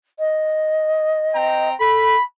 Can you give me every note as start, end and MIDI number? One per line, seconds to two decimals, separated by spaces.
0.19 1.70 75
1.33 1.73 60
1.33 1.73 79
1.33 1.73 82
1.79 2.16 69
1.79 2.21 83